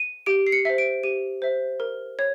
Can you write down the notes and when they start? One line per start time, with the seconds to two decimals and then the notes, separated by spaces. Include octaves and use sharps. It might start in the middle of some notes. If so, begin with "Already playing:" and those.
Already playing: D#7
0.26 G4 D7
0.47 C7
0.52 C#7
0.65 C5 E5
0.78 D7
1.03 G4 D#7
1.42 C5 E5
1.80 A#4
2.19 C#5